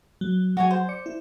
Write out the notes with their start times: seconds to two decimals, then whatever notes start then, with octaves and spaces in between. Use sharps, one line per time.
0.21 F#3
0.57 F#3 F#4 C#5 G#5
0.71 C5
0.88 D5 D6 C#7
1.06 E4